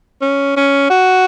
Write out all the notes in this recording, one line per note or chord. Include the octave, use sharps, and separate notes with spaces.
C#4
C#4
F#4